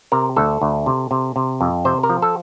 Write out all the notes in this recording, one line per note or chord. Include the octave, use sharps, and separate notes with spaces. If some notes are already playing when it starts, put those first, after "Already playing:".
C3 A#4
D2 A4
D2
C3
C3
C3
F2
C3 C5
A#4
F3
A4